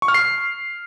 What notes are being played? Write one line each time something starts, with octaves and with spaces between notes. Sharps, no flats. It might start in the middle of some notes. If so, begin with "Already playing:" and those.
C#6
F6
C7